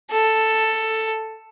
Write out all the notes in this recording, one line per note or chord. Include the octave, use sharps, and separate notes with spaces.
A4